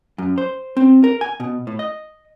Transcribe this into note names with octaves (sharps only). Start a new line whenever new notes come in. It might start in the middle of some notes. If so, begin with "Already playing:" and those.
F#2
C5
C4
A#4
G#5
B2
A2
D#5